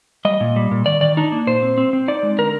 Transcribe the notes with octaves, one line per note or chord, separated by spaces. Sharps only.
G3 D#5
A#2
G3
A#2
D#3 D5
D#3 D5
D4 D#4
A#3
A#2 C5
C4
C4
C4
D#4 D5
G#3
D3 A#4